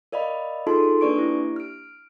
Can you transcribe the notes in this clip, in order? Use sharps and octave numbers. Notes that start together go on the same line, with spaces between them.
A#4 D5 D#5 F5 B5
D#4 F4 G#4 A4 A5 C6
A#3 D4 B4 D5 C#6 D7
E4 G4
F6 D7